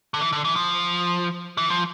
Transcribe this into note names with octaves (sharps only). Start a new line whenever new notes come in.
D3
E3
D3
E3
F3
E3
F3